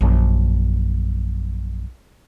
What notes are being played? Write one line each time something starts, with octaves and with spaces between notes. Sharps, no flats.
A#1 F#2